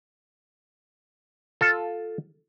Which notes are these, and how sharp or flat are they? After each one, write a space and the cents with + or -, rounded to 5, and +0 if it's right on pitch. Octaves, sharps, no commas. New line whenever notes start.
F4 +5 A4 +0